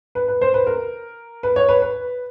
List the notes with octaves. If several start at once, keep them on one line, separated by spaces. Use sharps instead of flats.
B4
B4
C5
B4
A#4
B4
C#5
B4
B4